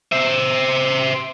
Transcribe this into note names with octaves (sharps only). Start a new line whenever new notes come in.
C5 E5